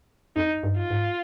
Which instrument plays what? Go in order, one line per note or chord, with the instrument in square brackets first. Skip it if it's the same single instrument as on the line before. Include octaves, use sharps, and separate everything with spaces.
[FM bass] F2 [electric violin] D#4
[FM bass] G2
[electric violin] F4
[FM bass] G#2